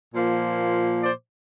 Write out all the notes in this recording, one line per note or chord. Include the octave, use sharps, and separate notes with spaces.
A#2 F3 A#3
C5 D5